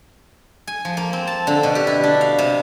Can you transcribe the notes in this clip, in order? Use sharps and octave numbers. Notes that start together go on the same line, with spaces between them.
G#5
F3
A#3
C4
A5
D3
B2
G4
E4
D4
F5
C3